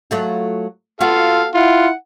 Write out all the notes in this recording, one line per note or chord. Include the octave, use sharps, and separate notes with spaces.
F#3 A3 F4
B3 F4 F#4 A4 F5
E4 F4 F#5